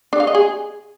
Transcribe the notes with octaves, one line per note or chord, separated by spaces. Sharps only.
D4
F5
D#5
G#4